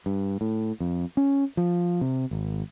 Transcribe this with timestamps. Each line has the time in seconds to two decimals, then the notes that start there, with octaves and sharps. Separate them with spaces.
0.06 G2
0.41 A2
0.80 F2
1.17 C#4
1.57 F3
2.01 C3
2.31 G#1